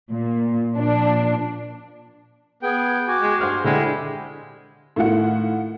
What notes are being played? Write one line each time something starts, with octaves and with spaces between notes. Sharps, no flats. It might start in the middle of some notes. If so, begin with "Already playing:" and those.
A#2
A#2 F3 D4
B3 G#4 G5
F#4 G#5 D6
G#3
G2 C5 F#5 C6 F6
D3 G#3 E4 G4
A2 D#3 F4 F#5